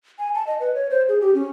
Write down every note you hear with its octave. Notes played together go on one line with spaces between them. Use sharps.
G#5
A5
D#5
B4
C#5
C5
G#4
G4
C#4